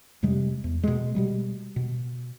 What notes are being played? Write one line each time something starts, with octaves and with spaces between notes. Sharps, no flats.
F2 C3 G3 G#3
E2
B2 G#3
B2 G3 G#3
B2